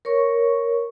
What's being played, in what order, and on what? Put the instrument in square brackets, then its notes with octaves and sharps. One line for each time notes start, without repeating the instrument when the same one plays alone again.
[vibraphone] A#4 C#5 C#6